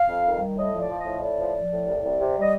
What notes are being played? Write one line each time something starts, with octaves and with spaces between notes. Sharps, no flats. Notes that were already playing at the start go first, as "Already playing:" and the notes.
Already playing: F5
F2
D#3
G3
A2 D#5
F3
D5
F3
D#5
A2
A2 D5
F3
F3
A2
C2
C2
C3
G3
D#5